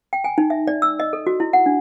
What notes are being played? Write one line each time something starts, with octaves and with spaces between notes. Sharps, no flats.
G5
G#5
D#4
E5
D5
E6
D#5
A4
F#4
E4
F#5
D4